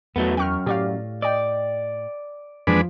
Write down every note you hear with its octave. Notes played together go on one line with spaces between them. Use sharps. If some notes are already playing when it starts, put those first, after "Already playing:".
E2 F#3 A3 B3
F#2 G5 C#6 F6
A2 G4 D5 F5
D5 D#5 G5
F2 E3 F3 G#3 A#3 D4 B4